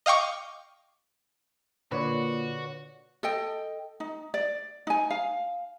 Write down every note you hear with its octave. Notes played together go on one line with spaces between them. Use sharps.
D#5 F5 G5 C#6 D6
A#2 D3 F#4 B4 C#5 D5
A4 D#5 G5
D#4
D5
D#4 G#5
F5